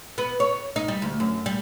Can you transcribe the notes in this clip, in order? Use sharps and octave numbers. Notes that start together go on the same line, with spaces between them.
B3
C#5
D#4
G3
D2
F#2
G3